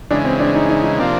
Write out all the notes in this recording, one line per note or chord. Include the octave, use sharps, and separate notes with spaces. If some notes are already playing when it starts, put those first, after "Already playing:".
C#3 E3 G#3 D4
C4
D4
D#4
D#4
D#4
C3 F3 A#3 C4 D4